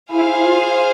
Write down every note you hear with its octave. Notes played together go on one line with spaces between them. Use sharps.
E4 G#4 C5 F5
F4